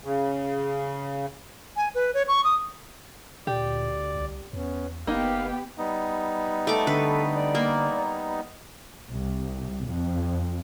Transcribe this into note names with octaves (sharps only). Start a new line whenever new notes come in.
C#3
G#5
B4
C#5
C#6
D#6
D2 A#2 G4 D5
C2
E2 B3 C#4
F#1 A#3 B3 D#4 G4 F5
G3 B3 D#4
A3 A4 D6
D3 B4
D5
A#3
C2
F2